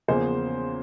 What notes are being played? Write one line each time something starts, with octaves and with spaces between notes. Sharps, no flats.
E2 C#3 F3 A#3 G#4 C5